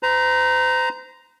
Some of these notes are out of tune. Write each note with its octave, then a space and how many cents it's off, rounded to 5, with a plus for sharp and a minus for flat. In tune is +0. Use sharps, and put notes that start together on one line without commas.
C5 -40 A#5 +5